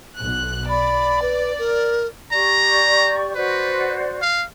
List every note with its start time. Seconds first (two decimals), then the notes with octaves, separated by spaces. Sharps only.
0.19 B1 F#6
0.69 D5 B5
1.22 B4
1.59 A#4
2.32 G4 D5 A#5 C#6
3.35 F#4 B4 C5 D5
4.22 F5